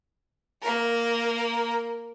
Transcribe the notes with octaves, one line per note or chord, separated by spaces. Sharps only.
A#3 A#4